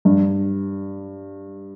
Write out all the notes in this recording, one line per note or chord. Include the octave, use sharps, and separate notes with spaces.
G2